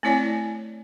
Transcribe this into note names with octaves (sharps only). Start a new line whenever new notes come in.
A3 C4 E4 C#5 D5 G#5